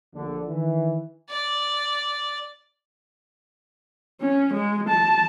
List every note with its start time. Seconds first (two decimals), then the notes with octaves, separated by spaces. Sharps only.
0.14 A#1 D3
0.47 D#3 E3
1.30 D5
4.21 C#4
4.54 G#3
4.89 A5